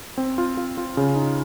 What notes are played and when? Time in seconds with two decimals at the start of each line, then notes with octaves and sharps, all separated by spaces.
0.18 C4
0.38 F4
0.57 F4
0.77 F4
0.97 C#3
1.16 D#4